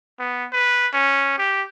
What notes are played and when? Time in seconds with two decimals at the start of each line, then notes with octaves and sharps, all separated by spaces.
0.19 B3
0.52 B4
0.94 C#4
1.38 G4